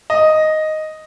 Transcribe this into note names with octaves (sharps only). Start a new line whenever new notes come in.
D#5